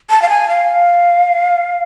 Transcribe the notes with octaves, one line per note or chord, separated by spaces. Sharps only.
A5
F5
G#5
F5